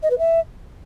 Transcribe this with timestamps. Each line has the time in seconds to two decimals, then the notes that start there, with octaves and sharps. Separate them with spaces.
0.02 D#5
0.10 B4
0.18 E5